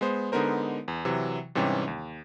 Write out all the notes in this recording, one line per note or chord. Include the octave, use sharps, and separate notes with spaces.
G#3 B3 C5
D3 G#3 B3 D#4 A#4 C5
E2
C3 E3 F#3
G#2 C3 E3 G3 C#4
D#2